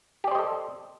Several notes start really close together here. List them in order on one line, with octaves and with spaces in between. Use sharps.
G4 D5 C5 D#5 A4